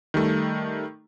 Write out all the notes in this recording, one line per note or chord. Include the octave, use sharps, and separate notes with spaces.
D#3 G3 A3